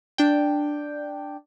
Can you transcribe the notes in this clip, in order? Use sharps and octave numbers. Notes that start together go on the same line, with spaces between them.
D4 G5